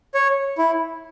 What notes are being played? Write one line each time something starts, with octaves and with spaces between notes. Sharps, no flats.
C#5
E4